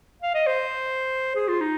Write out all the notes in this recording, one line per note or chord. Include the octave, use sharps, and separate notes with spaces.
F5
D#5
C5
G#4
F4
D#4